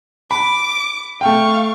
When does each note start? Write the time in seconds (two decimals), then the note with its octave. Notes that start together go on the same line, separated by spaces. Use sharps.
0.31 B5 D6
1.21 A3 F5 G5 C#6